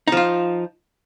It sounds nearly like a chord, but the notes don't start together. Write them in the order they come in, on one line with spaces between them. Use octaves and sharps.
D#4 F3 F4